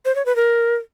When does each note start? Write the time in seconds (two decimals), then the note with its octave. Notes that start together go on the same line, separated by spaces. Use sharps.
0.05 C5
0.15 C#5
0.26 B4
0.36 A#4